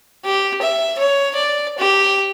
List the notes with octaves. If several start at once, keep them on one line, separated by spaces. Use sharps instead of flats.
G4
E5
C#5
D5
G4